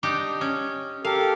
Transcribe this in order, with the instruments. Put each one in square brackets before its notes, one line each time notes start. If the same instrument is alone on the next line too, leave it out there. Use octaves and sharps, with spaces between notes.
[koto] D4 D#4 G4
C#4
[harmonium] G4 A4 A#4 [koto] F5